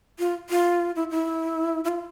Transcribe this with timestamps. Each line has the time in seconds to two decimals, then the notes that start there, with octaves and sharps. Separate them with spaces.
0.19 F4
0.50 F4
0.96 E4
1.11 E4
1.84 E4
1.88 F4